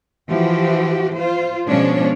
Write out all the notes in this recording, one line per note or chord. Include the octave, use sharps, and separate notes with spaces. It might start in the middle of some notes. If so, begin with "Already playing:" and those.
E3 F3 F#4 G4
F4 C5
B2 F3 G#3 C#4 D4 C#5